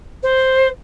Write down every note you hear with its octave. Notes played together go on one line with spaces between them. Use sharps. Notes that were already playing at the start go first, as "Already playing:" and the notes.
C5